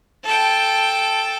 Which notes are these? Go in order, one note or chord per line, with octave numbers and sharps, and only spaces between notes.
A4 G5